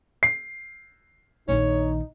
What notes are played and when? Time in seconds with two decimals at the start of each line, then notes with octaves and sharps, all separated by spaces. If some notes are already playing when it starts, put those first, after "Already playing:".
0.23 C7
1.48 A#1 D#3 D#4 C#5